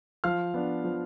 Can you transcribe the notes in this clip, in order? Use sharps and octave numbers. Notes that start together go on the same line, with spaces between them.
F3 F5 F6
B3 D4
F3